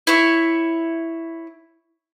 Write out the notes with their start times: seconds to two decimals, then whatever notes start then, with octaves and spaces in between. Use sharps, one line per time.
0.07 E4 C#5